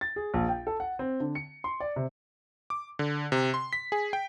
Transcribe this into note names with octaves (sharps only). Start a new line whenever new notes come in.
A6
G#4
A#1
G5
A4
F#5
C4
D3
C#7
C6
D5
C3
D6
D3
C3
C6
B6
G#4
G5